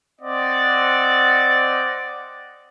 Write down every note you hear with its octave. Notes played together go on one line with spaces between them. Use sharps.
C4 D5 D#5 F#5